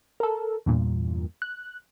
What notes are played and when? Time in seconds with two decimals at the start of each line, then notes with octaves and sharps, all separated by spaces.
0.20 A4 A#4
0.66 E2 G2 A#2
1.42 F#6